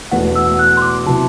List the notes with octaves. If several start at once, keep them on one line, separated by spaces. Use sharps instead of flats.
E1 E2 B2 A3 F#5
E6
F#6
C6
D6
C3 F#3 C4 E4 A5